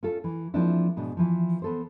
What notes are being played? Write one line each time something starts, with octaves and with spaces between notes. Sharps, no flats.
C#4 F4 A4
E3
F3 G#3 A#3 C4 D4 E4
G#2 B2 D4
E3 F3
B3 A4 C5